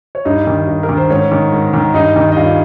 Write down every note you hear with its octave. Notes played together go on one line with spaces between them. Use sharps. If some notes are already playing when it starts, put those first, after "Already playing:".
C#5
G2 D#4 D#5
D#3
G2
A#4
D#3
C5
G#2 C#4 C#5
D#3
G#2
D#3
G2 D#4 D#5
D#3
D#5
G2 F4 F5